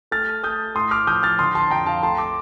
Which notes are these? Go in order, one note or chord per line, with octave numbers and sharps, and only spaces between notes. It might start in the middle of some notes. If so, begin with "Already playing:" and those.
A3 F6 A6
A3 D#6 G6
A2 C6 D#6
D6 F6
F3 D#6 G6
F6 A6
D3 C6 D#6
A5 C6
F2 G5 A#5
F5 A5
A3 A5 C6
A#5 D6